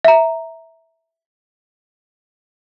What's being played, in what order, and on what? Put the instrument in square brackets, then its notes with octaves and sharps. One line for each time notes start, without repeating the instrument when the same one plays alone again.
[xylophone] E5 A#5